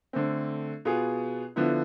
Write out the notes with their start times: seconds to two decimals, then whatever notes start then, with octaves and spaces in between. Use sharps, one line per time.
0.13 D3 A3 C4
0.85 B2 B3 F4 G#4
1.56 D3 F3 B3 E4